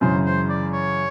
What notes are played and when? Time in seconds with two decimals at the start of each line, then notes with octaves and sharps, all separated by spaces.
0.01 F#2 C#3 E3 G#3 C5
0.25 C5
0.50 D5
0.73 C#5